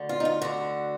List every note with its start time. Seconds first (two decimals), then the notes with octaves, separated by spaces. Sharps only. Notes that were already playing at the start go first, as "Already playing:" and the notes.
Already playing: D2 D3
0.09 F4
0.20 D#4
0.25 F4
0.42 D2 D3 F#4